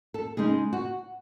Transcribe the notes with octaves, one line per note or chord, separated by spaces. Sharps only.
A4
C#3 G#3 D#4 G#4
F#4